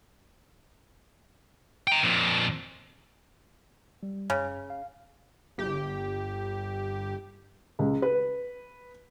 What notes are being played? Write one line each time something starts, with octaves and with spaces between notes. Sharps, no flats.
G5 A#5
F2 A#2
G3
F#2 C#3
F5
G1 G4
C#2
B4